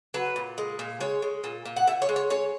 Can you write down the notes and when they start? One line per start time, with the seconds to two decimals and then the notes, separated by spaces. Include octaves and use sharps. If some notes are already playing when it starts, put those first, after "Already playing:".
0.14 F#3 B4
0.36 A#2
0.58 G#3
0.79 A#2
1.00 G#3 C#5
1.22 G#3
1.44 A#2
1.65 A#2
1.76 F#5
1.87 A#2 E5
2.02 C#5
2.09 G#3
2.16 C#5
2.30 G#3 C#5